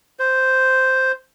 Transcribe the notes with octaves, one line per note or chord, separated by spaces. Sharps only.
C5